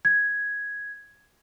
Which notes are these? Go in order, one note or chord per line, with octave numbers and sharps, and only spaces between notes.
G#6